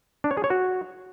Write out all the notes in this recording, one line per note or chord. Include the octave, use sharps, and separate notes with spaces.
D4
C#5
G#4
C#5
F#4